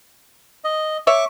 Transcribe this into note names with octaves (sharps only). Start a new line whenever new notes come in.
D#5
C#5 E5 C#6 D6